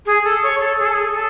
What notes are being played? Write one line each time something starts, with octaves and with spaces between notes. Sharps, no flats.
G#4
A4
C#5
A4
G#4
A4
G#4
A4